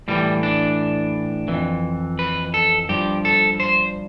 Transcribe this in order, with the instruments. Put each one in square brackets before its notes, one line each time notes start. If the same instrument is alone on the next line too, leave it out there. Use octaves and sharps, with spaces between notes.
[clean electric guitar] A2 E3 G3
D4
F2 E3
B4
A4
G2 F3 G4
A4
C5